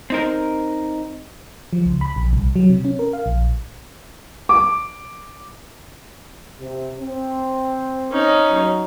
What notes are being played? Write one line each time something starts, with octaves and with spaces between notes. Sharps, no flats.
C4 D#4 A#4
F3
C#2
B5
A#1
C2
F#3
C3
C#4
A#4
F5
A#1
D6
C3
C4
C#4 D#4
F#3